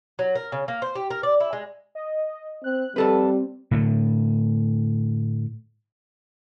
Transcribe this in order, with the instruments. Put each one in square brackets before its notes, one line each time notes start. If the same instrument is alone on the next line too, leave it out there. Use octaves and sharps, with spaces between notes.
[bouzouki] F#3
A#4
C#3
A#3
C5
G4
A#4
D5
E4
G#3
[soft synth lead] D#5
[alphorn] C4 [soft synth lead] F#6
[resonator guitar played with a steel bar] F2 A4 B4 [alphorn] G3 [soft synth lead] C4
[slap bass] A2 D3 A3